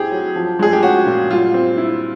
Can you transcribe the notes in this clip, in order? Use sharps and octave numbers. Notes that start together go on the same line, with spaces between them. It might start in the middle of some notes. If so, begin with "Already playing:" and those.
Already playing: C4 E4 G4 G#4
F#3
F3
G#3 G#4
G4
C#4 F#4
A#2
G3 F4
C4
E4